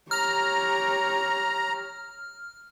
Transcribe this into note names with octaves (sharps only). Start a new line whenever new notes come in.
G4 C#5 A#5 F6